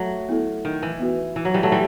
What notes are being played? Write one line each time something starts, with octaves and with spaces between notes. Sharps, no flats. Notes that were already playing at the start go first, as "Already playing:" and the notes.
Already playing: F#3 A3
B3 E4 A4
D#3
E3
B3 F#4 B4
E3
F#3
E3 G3
F#3 A3
E3 G3